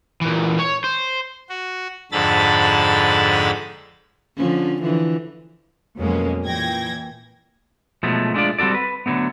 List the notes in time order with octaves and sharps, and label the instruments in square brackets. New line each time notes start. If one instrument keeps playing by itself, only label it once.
[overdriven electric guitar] A#2 E3
C#5
C5
[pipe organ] F#4
F2 G#2 D3 A4 B5 A6
[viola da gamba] D3 F3 C#4
D3 E3 F3
[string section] F2 B2 F#3 G#3 A#3 C#4
A#2 E3 G5 G#6 A#6
[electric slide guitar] B2 F3 F#3 G#3 A3
G#3 A3 D4 E4 F4 D5
G3 C4 F#4 A4 D5
B4
D3 F#3 A3 B3